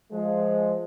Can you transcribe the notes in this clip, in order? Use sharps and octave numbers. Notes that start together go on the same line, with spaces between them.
F3 G#3